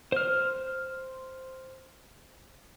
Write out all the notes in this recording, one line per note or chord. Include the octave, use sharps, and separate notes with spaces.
C5 F6